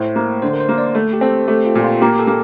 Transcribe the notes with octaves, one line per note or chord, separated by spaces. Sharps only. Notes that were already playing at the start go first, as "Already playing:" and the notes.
Already playing: A2 C5
A#3
D3 C5
A#4
C5
A#3
D5
A3
G4
C4 A4
A3 G4
F4
A#2
F4
A#3 G4
A4
A#3